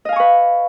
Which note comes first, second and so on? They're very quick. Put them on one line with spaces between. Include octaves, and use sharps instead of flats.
D#5 F5 G#5 C#6 B4